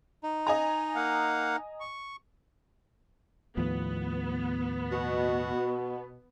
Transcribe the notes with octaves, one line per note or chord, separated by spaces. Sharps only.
D#4
D#5 G#5 A#5
A#3 F5 F#5
C#6
D#2 A2 F3 B3
B2 F#4